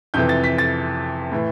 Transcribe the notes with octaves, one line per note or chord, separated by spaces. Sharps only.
F2 C3 E3 G6
A6
B6
A6
A2 E3